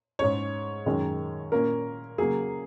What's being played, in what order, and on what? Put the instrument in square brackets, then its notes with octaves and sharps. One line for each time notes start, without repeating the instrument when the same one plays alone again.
[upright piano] G#2 G#3 C#4 C#5
F#2 D#3 G#3 C#4
A#2 A#3 C#4 A#4
C#3 F#3 A#3 G#4